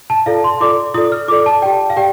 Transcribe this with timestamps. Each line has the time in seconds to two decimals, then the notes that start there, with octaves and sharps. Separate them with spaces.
0.10 A5
0.26 F4 A4 D5 F5
0.44 C6
0.61 F4 A4 D5 D6
0.94 F4 D#6
0.97 A4 D5
1.12 F6
1.28 F4 D6
1.31 A4 D5
1.46 A5
1.62 G4 D5 G5
1.90 F5
1.97 G4 D5 G5